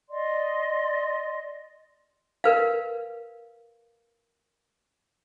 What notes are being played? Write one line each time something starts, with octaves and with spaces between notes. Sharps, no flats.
D5 D#5 C6
A#4 B4 F5